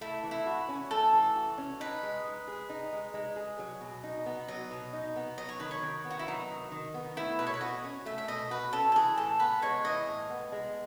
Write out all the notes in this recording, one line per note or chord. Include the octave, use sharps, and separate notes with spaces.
A3 E4
E3
E4
F#4
C#4
A3 A4
E3
F#4
C#4
D#4 B4
G#3
G#3
G#4
D#4
G#3
G#3
G#4
F#3
B2
D#4
B3
F#3 D#5
B2
D#4
B3
F#3 D#5
C#5
D#3 B4
C#5
D#3
B3
F#4
E4
F#3 D#4
D#3
D#3
B3
A3 E4
B2 B4
C#5
B4
F#4 D#5
C#4
A3 E5
E5
B2 D#5
F#4 B4
C#4 A4
A4
E3 G#4
A2 A4
B3 B4
G#3 C#5
E3 D#5
A2
B3
G#3